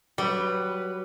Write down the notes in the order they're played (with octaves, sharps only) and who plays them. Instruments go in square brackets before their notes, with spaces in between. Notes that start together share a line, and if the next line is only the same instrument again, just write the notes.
[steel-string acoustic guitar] F#3 [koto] G3 [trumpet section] B4